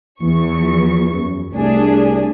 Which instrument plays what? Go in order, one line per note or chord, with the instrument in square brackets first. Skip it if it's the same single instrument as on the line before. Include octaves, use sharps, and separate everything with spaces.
[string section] E2 C#6 [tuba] E3
[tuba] F3
F#2
[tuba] C2 [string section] A3 D4 G#4